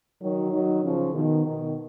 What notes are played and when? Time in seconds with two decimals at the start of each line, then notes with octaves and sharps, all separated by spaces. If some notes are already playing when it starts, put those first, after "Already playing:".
0.21 D#3 F#3
0.52 D#3 F#3
0.83 C#3 F3
1.14 B2 D#3
1.46 B2 D#3